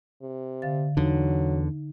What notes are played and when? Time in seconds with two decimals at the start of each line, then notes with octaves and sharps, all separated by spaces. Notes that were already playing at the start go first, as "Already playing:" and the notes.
0.22 C3
0.62 D3 F5 A6
0.97 E2 D3 F#3 D#4